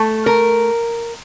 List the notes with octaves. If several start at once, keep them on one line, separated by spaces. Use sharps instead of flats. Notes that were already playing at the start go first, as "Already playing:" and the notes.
Already playing: A3
A#4